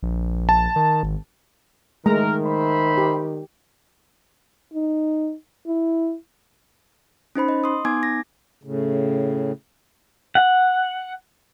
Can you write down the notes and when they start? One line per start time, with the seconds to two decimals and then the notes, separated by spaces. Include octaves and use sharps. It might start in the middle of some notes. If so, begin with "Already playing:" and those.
0.03 A#1
0.49 A5
0.76 D#3
1.03 G#1
2.06 D#3 G#3 A3 A#4 A#5
2.45 C5 E5 B5
2.98 G4
4.74 D#4
5.67 E4
7.35 C#4 D#4 C5 B5
7.48 D#5
7.64 C6 D#6
7.85 B3 D#4 G#5 D6 G#6
8.03 A#6
8.63 A2 C#3
10.35 F#5